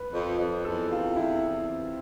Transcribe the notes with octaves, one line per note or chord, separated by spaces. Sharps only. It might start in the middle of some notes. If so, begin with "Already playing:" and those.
Already playing: B4
F2
F2
E2 A4
C3 F4
E2 E4
C4
C3